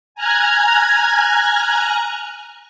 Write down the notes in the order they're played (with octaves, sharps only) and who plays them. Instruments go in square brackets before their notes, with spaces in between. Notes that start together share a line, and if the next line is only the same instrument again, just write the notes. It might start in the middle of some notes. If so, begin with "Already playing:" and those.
[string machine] G#5 A#5 F6 F#6 G#6